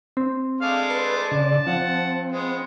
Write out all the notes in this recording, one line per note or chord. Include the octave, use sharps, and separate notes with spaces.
C4
G#3 A3 D4 F5
B4 A5 C6
C#3 D5
F3 C4 F#5
G#3 B3